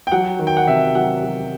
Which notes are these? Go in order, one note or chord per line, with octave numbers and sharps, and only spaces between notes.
G5
F#3 F#5
D#3
G5
F#5
C3 E5
F#3 F#5
F#3